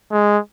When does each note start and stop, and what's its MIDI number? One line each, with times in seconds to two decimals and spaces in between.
0.12 0.38 56